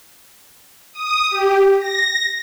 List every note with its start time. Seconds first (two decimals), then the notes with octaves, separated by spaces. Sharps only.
0.93 D#6
1.30 G4
1.79 A#6